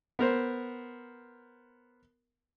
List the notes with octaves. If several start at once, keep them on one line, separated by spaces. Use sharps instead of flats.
B3 A#4 C5